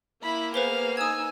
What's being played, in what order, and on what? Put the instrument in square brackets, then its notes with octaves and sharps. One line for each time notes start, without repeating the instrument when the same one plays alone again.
[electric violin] A#3 [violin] E4 [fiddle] B5
[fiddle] B3 [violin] G#4 F5 [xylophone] B4 C5 G7
[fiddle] D#4 E6 [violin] G#5 [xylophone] D#6 G#6